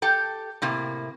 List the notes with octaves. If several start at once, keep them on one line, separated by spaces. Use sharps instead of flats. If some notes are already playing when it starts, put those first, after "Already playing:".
G4 A4 G5
A2 C3 A#3